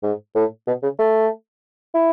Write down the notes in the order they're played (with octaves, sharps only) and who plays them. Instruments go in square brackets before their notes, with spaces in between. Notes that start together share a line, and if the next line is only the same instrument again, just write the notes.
[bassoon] G#2
A2
B2
C#3
A3
E4